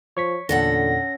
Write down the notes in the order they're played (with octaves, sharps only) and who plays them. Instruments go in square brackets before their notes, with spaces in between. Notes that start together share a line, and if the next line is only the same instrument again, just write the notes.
[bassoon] F3 [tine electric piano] C#5 C#6 B6
[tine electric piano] E2 A#2 [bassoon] D3 [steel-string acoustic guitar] C#4 A4 F#5 [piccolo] A#6